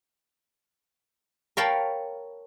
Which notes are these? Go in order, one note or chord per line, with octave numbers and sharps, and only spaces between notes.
A#4 C#5 F5 G5 A5 B5